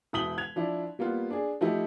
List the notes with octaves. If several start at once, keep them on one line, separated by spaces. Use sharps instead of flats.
E1 E4 D#6 B6 F#7 G7
G#6 F7
F3 D4 E4
G3 A#3 B3 F4
D4 G#4
F3 A3 D#4 E4 G4